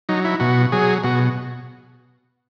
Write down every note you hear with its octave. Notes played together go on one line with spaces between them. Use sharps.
F#3 D#4
E4
B2 F#4
F#3 G#4
B2 F#4